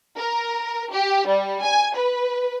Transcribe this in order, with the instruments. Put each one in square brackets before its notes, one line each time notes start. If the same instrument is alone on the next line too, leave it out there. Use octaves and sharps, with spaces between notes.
[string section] A#4
G4
G3
G#5
B4